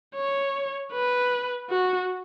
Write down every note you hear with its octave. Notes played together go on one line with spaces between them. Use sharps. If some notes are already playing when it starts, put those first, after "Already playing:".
C#5
B4
F#4